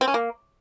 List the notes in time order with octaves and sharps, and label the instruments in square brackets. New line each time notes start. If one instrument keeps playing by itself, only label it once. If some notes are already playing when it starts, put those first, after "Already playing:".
[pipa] C4
C#4
A#3